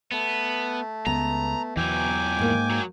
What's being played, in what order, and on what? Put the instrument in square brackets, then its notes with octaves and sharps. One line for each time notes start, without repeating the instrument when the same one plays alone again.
[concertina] A3 [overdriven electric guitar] B3
[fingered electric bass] C#2 [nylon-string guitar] B3 [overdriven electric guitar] A#5
[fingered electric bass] E2 [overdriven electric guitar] E3 F#3 [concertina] G5 G#5 D6
[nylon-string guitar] G#2 A#3
[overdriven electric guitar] F#3